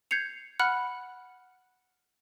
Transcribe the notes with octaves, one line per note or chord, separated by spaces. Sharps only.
G6 G#6 C7 C#7 F7
F#5 B5 F6 F#6 C#7